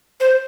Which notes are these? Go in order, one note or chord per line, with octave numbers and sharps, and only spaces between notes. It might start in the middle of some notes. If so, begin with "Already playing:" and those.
C5